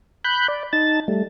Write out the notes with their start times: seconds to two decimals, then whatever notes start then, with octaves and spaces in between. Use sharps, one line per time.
0.25 B5 F#6 G6
0.48 D5
0.73 D#4 A5 A6
1.08 G3 A3